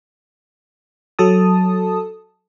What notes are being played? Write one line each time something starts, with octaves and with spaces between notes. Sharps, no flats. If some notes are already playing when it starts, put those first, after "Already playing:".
F#3 A4 A5 D#6